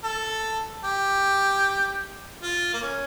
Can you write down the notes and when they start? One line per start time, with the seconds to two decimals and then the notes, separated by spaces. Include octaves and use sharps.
0.04 A4
0.84 G4
2.42 F4
2.73 A#3
2.82 C#4